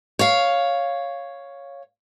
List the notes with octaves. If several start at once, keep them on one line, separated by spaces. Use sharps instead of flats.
C#5 F5